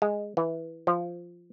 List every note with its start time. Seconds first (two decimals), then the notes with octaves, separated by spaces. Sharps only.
0.02 G#3
0.37 E3
0.87 F3